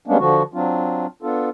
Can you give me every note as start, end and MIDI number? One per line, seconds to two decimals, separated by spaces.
0.08 0.17 55
0.08 0.17 56
0.08 0.17 58
0.08 0.17 59
0.08 0.17 61
0.08 0.17 62
0.19 0.43 50
0.19 0.43 53
0.19 0.43 66
0.54 1.06 54
0.54 1.06 60
0.54 1.06 62
0.54 1.06 65
1.23 1.49 59
1.23 1.49 62
1.23 1.49 65
1.23 1.49 69